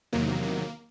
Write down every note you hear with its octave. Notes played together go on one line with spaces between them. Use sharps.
E2 C3 D#3 F#3 A#3
A#3